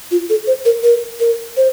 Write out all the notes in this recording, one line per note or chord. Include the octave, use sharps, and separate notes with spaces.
F4
A4
C5
A#4
A#4
A#4
C5